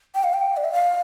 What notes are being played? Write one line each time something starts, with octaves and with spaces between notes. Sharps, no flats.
G5
F5
G5
D5
E5
F5